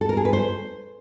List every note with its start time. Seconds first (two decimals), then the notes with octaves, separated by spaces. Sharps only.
0.01 A4
0.09 A#4
0.17 G#4
0.25 B4
0.33 C5